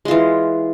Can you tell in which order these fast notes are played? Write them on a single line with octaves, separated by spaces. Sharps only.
G#3 F4 E3